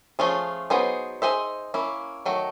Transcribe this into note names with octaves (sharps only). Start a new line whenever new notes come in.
F3 A3 C#4 F4 G#4
F#3 B3 D#4 G#4 C5
D#4 G#4 C5 E5
A#3 C#4 E4
D#3 F#3 A3